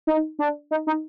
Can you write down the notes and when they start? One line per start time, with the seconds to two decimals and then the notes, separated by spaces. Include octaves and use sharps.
0.07 D#4
0.39 D4
0.71 D#4
0.87 D#4